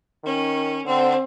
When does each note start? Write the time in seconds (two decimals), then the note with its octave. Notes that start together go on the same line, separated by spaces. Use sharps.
0.24 D#3 C#4
0.85 D3 C4